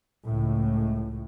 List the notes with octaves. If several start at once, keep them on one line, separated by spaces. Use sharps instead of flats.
C#2 A2